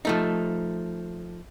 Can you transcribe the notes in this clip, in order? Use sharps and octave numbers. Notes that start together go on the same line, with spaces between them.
F3 A3 D#4